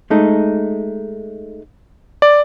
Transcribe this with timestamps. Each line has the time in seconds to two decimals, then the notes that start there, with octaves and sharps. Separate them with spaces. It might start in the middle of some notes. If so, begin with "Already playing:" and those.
0.10 G#3 A3 D#4
2.22 D5